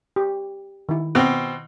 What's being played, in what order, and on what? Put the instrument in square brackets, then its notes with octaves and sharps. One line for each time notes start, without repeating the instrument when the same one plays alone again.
[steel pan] G4
D#3 E4
[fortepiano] B2 C4